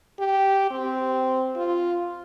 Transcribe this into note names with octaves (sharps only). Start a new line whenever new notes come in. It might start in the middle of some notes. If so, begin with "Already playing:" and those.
G4
C4
F4